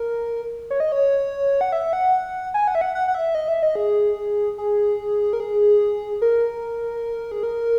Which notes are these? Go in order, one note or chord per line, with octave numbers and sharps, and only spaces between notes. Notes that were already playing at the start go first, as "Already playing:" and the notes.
Already playing: A#4
C#5
D#5
C#5
F#5
E5
F#5
G#5
F#5
E5
F#5
F#5
F#5
E5
D#5
E5
D#5
G#4
G#4
A#4
G#4
A#4
G#4
A#4